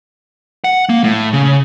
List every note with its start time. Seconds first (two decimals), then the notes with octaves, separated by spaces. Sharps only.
0.64 F#5
0.89 A#3
1.04 A2
1.33 C#3